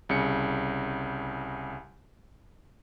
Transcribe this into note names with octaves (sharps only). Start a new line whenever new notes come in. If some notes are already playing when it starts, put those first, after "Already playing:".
C2 C#3 C#7